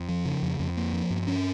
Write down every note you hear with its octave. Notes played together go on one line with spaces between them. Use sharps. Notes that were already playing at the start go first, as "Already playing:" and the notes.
Already playing: F2
F3
C#3
F2
F2
A#3
F3
G2
C#4